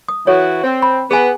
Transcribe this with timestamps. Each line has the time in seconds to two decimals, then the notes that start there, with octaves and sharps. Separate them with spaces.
0.08 D#6
0.27 E3 F#4 A4 C#5
0.64 C4
0.82 B5
1.11 B3 G#4 G#5